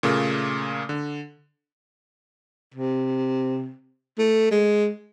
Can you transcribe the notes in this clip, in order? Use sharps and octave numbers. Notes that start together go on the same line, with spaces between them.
A#2 C#3 A3 A#3
D3
C3
A3
G#3